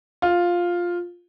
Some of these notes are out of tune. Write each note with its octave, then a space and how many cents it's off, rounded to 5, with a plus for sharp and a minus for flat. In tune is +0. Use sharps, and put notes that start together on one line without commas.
F4 +5